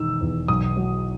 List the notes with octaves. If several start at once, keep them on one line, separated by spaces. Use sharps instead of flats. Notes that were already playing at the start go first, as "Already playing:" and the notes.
Already playing: E1 D#3 E6
E2
B1 D#6
F#3